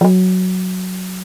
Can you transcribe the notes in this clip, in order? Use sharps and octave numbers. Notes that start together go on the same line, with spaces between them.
F3
F#3